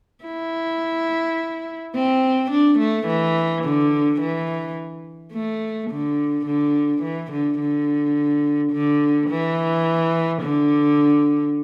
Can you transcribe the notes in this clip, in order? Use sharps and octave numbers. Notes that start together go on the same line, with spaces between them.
E4
C4
D4
A3
E3
D3
E3
A3
D3
D3
E3
D3
D3
D3
E3
D3